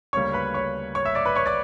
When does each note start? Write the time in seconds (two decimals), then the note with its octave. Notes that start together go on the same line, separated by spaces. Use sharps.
0.13 D2 C#3 G3 A#3 C#5 C#6
0.33 B4 B5
0.54 C#5 C#6
0.95 C#5 C#6
1.05 E5 E6
1.15 D5 D6
1.26 B4 B5
1.35 C#5 C#6
1.46 D5 D6